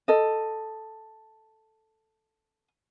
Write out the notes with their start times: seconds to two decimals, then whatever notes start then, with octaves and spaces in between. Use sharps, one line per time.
0.08 A4 D#5